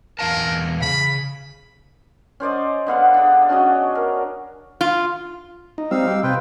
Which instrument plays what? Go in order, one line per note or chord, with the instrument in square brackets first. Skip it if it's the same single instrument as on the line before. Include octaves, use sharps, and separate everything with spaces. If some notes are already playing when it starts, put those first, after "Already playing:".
[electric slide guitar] E2 F5 A5 [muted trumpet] A#4
[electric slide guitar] C#3 [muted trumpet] B5
[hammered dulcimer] C#4 C5 D5 D#5
D3 B3 F5 F#5
D4 G#4
C#4 D4 F#4 D#5
A#4
[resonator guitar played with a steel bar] F4
[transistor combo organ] D#4
[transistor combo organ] G3 C4 [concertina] D#4 F5 E6
[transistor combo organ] G4
[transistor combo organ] C3 [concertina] F4 B4 G5